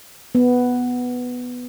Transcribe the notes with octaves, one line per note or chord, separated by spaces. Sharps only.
B3